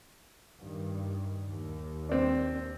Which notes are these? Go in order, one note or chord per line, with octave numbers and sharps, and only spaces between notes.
G2 D#3
D#2
C4 D4